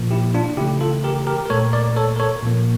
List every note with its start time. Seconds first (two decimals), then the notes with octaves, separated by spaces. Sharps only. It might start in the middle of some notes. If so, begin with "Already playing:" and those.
Already playing: A#2 F3 A#3
0.11 E4 G4
0.34 D4 F4
0.57 C#3 E3 A3 E4 G4
0.81 F4 A4
1.04 G4 A#4
1.27 G4 A#4
1.46 A#4
1.50 A#2 A3 A4 C#5
1.73 A#4 D5
1.96 A4 C#5
2.16 A#4
2.20 A4 C#5
2.43 A#2 F3 A#3